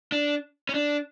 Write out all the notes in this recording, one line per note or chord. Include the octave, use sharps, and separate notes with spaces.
D4
C#4
D4